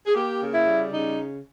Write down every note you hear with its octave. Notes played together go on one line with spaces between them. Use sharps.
G#4
A#3 G4
C#3
E4
G3
C#3 D#4